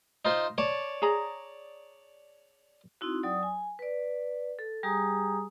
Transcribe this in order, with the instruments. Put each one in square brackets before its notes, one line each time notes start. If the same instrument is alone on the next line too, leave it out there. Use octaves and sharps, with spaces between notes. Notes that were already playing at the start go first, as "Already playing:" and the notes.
[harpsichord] D#4 F4 C5
C#5 D5 A5
[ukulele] G#4 A#5
[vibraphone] C4 D#4 E4 F#4
F#3 D5 G5 D#6
G#5
B4 D5
A4
G3 G4 G#4 G#5 A#5 D#6